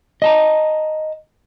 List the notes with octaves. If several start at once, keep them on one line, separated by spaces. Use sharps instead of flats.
D#5 A5 A#5